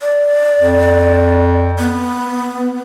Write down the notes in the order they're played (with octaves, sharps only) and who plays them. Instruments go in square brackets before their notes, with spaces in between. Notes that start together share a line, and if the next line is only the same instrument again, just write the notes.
[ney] D5
[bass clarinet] F2
[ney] B3